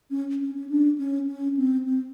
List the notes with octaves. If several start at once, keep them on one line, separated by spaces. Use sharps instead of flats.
C#4
C#4
C#4
D4
C#4
C#4
C4
C4